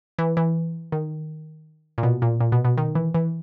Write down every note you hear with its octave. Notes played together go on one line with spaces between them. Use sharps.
E3
E3
D#3
A#2
B2
A#2
A#2
B2
B2
D#3
E3
E3